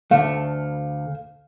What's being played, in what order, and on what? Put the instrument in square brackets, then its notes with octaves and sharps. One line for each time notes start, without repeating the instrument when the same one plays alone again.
[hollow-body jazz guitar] D2 A3 [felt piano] F5